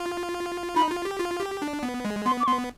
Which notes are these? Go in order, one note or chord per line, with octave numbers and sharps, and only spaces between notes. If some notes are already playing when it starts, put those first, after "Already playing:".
Already playing: F4
D#4 B5
F4
G4
F4
G4
D4
B3
G#3
B3 C6
D6
B3 C6